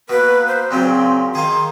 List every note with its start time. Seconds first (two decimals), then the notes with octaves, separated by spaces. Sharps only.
0.09 B2 A#3 B4
0.47 C5
0.71 A#2 C#3 F#3 C4 C6
1.35 D#3 G#4 F5 C6